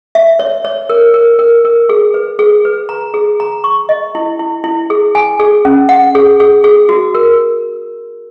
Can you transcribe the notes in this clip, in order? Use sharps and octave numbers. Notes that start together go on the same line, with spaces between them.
E5
C#5
C#5
A#4
A#4
A#4
A#4
G#4
B4
G#4
B4
A#5
G#4
A#5
C#6
D#5
E4
E4
E4
G#4
G#5
G#4
C#4
F#5
G#4
G#4
G#4
F#4
A#4